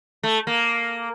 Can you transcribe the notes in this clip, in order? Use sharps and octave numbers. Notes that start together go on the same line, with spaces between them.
A3
A#3